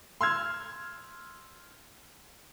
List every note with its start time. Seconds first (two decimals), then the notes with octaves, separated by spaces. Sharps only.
0.21 C6 E6 F6 G#6